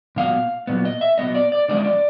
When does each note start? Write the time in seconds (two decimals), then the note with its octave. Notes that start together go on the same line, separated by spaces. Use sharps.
0.16 A#2 F#3 B3 F5
0.67 A#2 F#3 B3
0.85 D#5
1.01 E5
1.18 A#2 F#3 B3 D#5
1.35 D5
1.52 D5
1.69 D3 F3 G#3 C#4 D5
1.77 D#5
1.84 D5